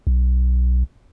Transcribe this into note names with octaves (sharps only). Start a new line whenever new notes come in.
B1